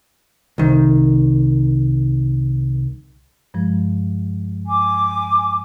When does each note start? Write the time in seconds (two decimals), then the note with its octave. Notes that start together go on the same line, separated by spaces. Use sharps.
0.58 C2 D#3
3.54 G2 F3 G#3
4.66 G#5 D6